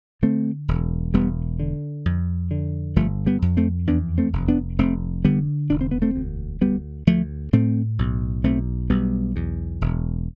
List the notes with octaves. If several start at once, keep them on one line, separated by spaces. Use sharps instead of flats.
D3 A3 C4
E1
E1 G3 B3
D3
F2
D3
G1 F3 A3
G3 B3
F2
A3 C4
E2 B3 D4
A3 C4
F1
B3 D4
F1 A3 C4
D3 G3 B3
E1 D4
C4
B3
A3 C4
D2
D2 G3 B3
D2 F3 A3
A2 A3 C4
B1
B1 A3 C4
B1 G3 B3
E2
E1